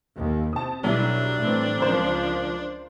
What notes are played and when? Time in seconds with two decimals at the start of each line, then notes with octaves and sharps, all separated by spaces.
0.16 D#2
0.53 C3 A5 D#6
0.84 B1 F#3 G3 D4 E4
1.38 A2 E3 C4
1.80 C#2 F3 A#4 C5 A#5